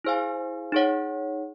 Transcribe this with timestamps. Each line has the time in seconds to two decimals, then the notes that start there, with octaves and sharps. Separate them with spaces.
0.04 E4 G#4 C5 F5 G#5
0.72 D#4 G#4 C#5 F#5